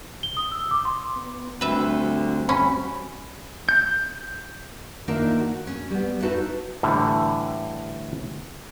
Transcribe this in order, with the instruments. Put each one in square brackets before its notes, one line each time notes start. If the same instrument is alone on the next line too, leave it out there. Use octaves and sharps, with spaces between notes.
[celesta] G7
D#6
E6
D6
C6
[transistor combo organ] B3
[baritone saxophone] D2 [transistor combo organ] G3 C4 F#4 [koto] B4 E5
[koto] C#4 [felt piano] B5
[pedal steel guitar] G6
[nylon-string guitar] D#3 A#3 D4 F4 A#4 E5
F#4
C#4
G3 B3
D#4 E4 F#4 A4 B4
[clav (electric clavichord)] A2 D3 E3 G3